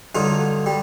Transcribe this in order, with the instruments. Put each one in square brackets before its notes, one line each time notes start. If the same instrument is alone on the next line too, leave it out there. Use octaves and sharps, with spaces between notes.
[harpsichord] G2 D3 F#3 D#4 F4
G3